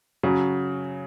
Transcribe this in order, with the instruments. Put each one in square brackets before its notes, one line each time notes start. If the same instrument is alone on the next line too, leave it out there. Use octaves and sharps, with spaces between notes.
[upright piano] C#3 [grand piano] F#3